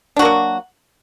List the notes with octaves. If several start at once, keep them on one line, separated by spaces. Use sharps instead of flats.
F#3 A#3 D4 F#4